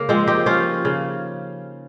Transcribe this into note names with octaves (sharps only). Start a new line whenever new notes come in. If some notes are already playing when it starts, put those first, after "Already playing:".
Already playing: C#3 A#3
F3 G#3 C4
D#4 G4
F3 C#4 F4
C#3